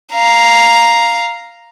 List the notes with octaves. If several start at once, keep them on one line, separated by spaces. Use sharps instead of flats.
F5 A#5